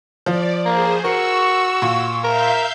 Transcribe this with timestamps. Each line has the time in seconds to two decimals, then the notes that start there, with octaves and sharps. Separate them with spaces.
0.26 F3 D5
0.66 A#3 G#4 C5
1.04 F#4 A#4 C#6 E6
1.82 A#2
2.24 A#4 E5 F5 G6